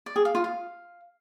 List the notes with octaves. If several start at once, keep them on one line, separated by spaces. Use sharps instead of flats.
D5
G#4
F5
F4
F5